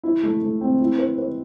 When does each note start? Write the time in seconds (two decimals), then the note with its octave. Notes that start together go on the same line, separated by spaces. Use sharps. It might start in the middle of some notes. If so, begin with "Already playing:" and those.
0.03 E4
0.23 A3
0.42 A3
0.61 C4
0.80 E4
0.98 B4
1.18 B4